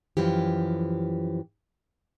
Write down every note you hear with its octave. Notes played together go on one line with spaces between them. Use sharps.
F#2 E3 F3 G4